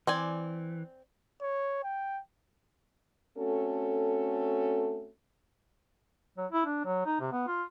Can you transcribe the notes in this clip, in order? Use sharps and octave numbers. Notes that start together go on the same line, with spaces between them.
E3 C4 D5 G#5
C#5
G5
A3 C4 C#4 F#4 A4
F#3
E4
D4
F#3
D#4
C3
B3
F4